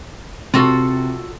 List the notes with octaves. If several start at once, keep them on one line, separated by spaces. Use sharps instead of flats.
C3 F4 F#4 A4